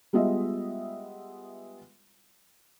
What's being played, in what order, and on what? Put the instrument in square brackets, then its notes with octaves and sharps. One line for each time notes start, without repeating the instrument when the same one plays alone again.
[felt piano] G3 G#3 B3 F4 D#5 E5